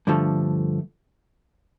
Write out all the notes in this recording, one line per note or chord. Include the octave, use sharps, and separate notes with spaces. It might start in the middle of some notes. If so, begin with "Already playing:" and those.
G2 D3 F3 A3